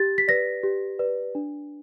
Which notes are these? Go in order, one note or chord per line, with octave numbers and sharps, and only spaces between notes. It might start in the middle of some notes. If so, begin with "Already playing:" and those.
Already playing: G4 A6
B6
B4 D5 A#6
G4
B4 D5
D4